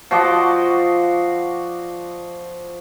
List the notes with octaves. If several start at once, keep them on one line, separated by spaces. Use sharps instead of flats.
F3 F#4 D5 D#5